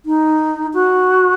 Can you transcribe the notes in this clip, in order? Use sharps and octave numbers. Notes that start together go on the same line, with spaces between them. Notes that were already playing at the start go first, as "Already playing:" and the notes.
D#4
F#4